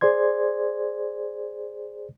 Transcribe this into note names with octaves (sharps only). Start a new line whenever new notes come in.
G#4 C5 D5 C6 G#6